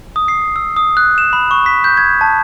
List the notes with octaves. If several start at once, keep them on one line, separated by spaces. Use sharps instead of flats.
D#6
C7
E6
D#6
F#6
E7
B5
C#6
B6
G6
G#6
A5